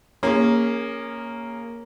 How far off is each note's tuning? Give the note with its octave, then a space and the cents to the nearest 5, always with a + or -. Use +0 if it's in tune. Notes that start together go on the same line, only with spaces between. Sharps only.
A#3 +0 C#4 +0 G#4 -25